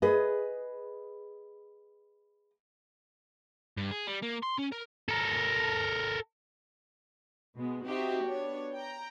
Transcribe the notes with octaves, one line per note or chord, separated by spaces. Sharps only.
G#4 B4 D#5
G2
G#4
G3
A#3
C6
C#4
A#4
A4 A#4
B2 G#3 B3
C4 D#4 F#4 G4 E5
B3 D4 C#5
G5 A#5